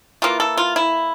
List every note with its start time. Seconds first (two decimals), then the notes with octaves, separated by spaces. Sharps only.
0.22 E3 A#3 F4
0.40 A4
0.57 F4
0.76 E4